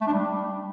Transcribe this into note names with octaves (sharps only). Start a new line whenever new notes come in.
A3
D4
G3